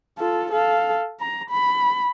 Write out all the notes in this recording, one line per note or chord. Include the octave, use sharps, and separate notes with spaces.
F4 A4
A4 F5
A#5
B5